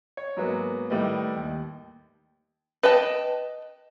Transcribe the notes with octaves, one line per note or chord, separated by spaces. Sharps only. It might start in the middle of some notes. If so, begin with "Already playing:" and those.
C#5
G#2 F#3 A#3 B3
A2 D#3 G3 A3 B4 D#5
D#2
B4 D#5 G5 A5